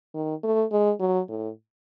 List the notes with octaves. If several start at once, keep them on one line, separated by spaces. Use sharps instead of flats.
D#3
A3
G#3
F#3
A2